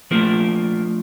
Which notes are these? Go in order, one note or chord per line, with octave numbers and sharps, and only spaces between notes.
F3 A3 A#3 D4 F4 A#4